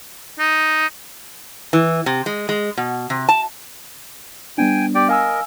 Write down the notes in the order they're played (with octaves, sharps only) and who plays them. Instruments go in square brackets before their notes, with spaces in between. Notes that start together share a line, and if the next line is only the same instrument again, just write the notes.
[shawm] D#4
[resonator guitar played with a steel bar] E3
C3
G#3
G#3
B2
C3
A5
[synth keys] G3 B3 D4 [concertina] G5 G#5
[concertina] G4 D5 G5
[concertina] A#4 D#5 [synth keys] F5 G#5 E6